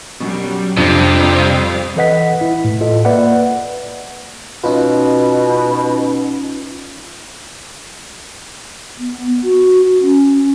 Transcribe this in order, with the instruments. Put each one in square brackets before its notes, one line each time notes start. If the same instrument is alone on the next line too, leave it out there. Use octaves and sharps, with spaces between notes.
[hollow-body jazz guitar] F#2 B2 [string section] F#3 G3
[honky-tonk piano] F2 [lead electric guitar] C3 [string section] G3 C4 F5 [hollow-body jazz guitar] D4
[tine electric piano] E3 A4 B4 D#5 F#5 B6
E4
A2
F4 A4 D#5
A#3 B4 D5 E5 F#5
[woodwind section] B2 [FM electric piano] C#4 D#4 F4
[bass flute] B3
F#4
C#4